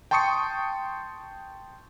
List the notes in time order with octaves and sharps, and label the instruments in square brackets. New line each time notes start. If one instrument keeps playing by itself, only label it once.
[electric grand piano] G5 A5 C6 C#6 D#6 C#7